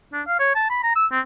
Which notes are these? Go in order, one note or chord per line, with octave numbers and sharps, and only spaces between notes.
D4
F5
C#5
A5
B5
A#5
E6
C4